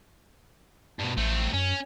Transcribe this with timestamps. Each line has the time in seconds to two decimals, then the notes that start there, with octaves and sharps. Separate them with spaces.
0.99 G2 B2
1.17 A1 A3 C4
1.53 F#2 C#4